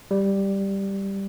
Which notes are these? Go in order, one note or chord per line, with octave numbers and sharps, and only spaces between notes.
G3